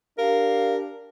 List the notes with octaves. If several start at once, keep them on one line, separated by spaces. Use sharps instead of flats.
D4 G4 A#4 F5